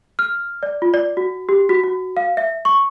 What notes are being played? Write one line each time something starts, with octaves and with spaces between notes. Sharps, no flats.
F6
D5
F4
D5
F#4
G4
F#4
F#4
F5
E5
C#6